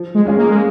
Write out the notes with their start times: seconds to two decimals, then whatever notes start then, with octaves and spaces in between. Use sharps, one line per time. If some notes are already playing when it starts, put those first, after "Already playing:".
Already playing: F3
0.15 G#3
0.25 G#3 C#4 F4 G#4
0.37 A#3
0.49 G#3